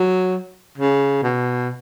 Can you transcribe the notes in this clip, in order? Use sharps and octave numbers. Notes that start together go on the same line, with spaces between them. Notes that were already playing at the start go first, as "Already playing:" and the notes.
Already playing: F#3
C#3
B2